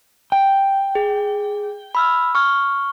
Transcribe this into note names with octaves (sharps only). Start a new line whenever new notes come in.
G5
G#4
B5 E6 F6
C#6 F6